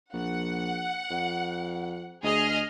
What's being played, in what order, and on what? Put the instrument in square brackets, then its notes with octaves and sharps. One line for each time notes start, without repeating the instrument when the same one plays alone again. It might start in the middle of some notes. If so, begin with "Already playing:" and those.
[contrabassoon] A#1 [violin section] F#5
[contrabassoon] F2
[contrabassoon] D2 [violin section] G#4 D#5 F6